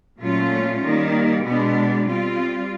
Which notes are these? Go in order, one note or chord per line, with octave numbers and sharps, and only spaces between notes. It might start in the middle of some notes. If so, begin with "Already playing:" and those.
A#2 F#3 A3 C#4 F4
D#3 G3 A#3
B2 G#3 B3 D4
G3 C4 F4